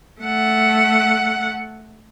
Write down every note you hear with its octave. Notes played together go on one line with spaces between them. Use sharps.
A3 F#5